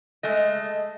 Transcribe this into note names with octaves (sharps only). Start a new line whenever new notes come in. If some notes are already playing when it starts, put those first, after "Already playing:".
G#3 A3 D#5